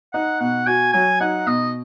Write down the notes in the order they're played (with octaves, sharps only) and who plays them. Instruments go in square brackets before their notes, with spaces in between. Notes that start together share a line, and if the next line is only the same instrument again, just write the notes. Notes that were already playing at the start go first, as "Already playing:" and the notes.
[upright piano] D#4 [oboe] F#5
[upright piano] B2 [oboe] F#5
[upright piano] F#4 [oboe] G#5
[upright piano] F#3 [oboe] G#5
[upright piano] D#4 [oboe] F#5
[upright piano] B2 [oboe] D#5